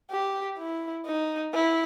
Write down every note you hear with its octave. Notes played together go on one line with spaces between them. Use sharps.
G4
E4
D#4
E4